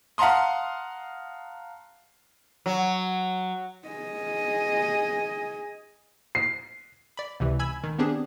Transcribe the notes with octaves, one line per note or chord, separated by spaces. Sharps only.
F5 F#5 A5 A#5 C6 D#6
F#3
G#4 D#5
C7
D5 B5
C#2 C3 E3
G#5 B5 E6 G#6
D#3
B3 C4 D4 G4 G#4